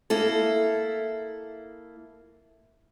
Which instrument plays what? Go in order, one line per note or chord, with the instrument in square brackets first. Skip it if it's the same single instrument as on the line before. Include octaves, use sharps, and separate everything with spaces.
[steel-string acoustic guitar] A#3 E4 A4